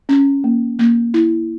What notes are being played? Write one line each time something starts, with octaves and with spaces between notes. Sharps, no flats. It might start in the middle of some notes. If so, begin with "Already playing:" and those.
C#4
A#3
A#3
E4